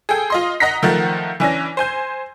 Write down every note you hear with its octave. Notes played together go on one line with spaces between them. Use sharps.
G#4 A4 G5
F4 D#5 C6
D#5 F#5 A#5 A#6 B6
D#3 F3 A3 A#4 F#5 A6
E3 C#4 D4 A#6
C5 G#5 G6